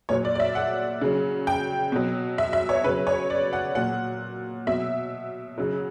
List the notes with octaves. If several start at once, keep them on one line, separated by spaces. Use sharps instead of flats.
A#2 F#3 C#5
D5
D5
E5
F#5
C#3 F#3
G5
B2 F#3
E5
E5
C#5
C#3 F#3 B4
C#5
D5
F#5
A#2 F#3 F#5
B2 F#3 E5
C#3 F#3